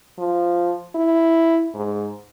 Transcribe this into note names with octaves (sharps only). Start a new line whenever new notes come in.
F3
E4
G#2